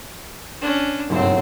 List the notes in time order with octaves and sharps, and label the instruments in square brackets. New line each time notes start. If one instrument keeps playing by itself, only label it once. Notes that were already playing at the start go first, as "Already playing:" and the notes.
[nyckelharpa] C#4 D4
[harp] F#1 B1 G2 [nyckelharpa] A3 C4